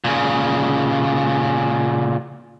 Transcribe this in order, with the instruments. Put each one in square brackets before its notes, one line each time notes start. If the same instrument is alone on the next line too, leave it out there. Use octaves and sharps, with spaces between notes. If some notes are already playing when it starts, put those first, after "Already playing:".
[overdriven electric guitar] A#2 C#3